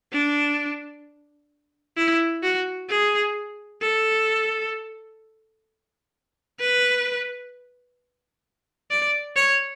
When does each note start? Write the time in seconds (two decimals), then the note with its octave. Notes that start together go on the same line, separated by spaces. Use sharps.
0.13 D4
1.97 E4
2.43 F#4
2.90 G#4
3.82 A4
6.60 B4
8.91 D5
9.36 C#5